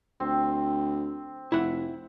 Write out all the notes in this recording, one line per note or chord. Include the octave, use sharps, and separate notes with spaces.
D2 C4
F1 E4 F#5